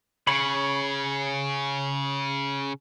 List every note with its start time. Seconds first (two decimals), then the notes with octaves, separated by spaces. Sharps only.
0.27 C#3 C#5 B5